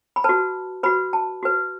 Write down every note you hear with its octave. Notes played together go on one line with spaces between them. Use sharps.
B5
F#4 B4 A5
F#4 B4 B5
A5
F#4 B4